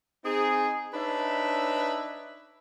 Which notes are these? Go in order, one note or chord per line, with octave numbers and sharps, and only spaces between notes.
C4 D#4 G#4
D4 D#4 B4 C#5 E5